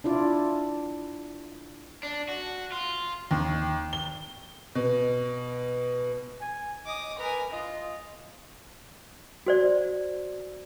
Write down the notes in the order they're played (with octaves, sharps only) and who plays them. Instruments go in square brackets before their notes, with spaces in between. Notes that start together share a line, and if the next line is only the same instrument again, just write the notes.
[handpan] D4 E4 F4 D5
[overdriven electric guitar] D4
F#4
F4
[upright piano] D#2
G7
B2
[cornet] G#5
[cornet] D#5 [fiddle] D6 D#6
[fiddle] A#4 G#5 [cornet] B4
[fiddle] F4 [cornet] D#5
[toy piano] F#4 C5 D5